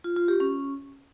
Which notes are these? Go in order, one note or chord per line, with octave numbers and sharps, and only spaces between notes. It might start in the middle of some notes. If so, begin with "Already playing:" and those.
F4
F4
G4
C#4